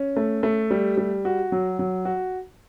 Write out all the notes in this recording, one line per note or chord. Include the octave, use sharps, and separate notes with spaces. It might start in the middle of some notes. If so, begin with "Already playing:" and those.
Already playing: C#4
A3
A3
G3
G3
F#4
F#3
F#3
F#4